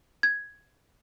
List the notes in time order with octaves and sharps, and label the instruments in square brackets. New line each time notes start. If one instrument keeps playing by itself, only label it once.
[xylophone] G#6